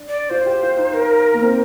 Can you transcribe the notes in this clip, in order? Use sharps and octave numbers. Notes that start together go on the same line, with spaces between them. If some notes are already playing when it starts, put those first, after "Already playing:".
Already playing: D4
D5
F4 C5
G4
F4
D#4
A#4
A#3
C4